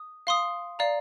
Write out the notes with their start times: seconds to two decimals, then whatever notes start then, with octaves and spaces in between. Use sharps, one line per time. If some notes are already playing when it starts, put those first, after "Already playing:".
Already playing: D#6
0.27 F5 C6 D#6
0.79 D5 F5 A#5